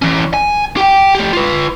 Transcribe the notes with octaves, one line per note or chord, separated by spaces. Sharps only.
E3 C#4
G#5
G4 G5
A3 G4
F4 B4